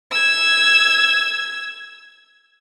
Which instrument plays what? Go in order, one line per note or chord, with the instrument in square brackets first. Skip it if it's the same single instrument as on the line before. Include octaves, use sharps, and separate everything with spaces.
[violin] E6 G#6